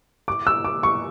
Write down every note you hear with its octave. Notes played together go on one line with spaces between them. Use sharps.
D6
E6
D6
C#6